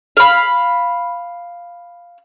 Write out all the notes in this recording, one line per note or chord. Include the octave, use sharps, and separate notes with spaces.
F5 B5